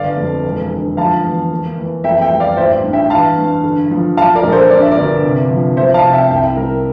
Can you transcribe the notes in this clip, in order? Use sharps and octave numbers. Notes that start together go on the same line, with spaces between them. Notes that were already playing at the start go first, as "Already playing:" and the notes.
Already playing: G1 D5 F5
F2
E1
D3
F3 F5 A5
E2
A#3
E3
F2 E5 G5
E5 G5
G3
D5 F5
A1 C5 E5
G2
E5 G5
E3 F5 A5
G2
D3
F3
F3 F5 A5
A#4 D5
A#1
A4 C5
G2 D5
E5
A#4 D5
G1
C3
F3
F3 C5 E5
F5 A5
C3
E5 G5
C2 E5 G5
G3 A#4